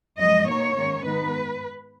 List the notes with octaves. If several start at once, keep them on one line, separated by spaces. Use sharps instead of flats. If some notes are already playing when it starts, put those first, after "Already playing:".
F#2 F3 G#3 D#5
B2 A#3 D#4 C#5
G#2 D#3 A#3 C#4
G#2 D#3 G#3 B3 D#4 B4